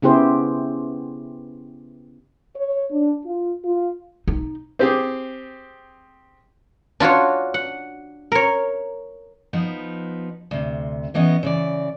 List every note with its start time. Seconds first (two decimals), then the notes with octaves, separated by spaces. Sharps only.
0.02 C#3 B3 E4 G4 G#4 C5
2.55 C#5
2.90 D4
3.24 F4
3.64 F4
4.28 D#4
4.79 C4 G4 G#4
7.00 D4 F4 F#4 C#5
7.54 F#5
8.32 A#4 C#5
9.53 F3 B3 D#4
10.51 D2 C3
11.14 A2 E3 B3 C#4 D#5
11.43 C#3 E3 D5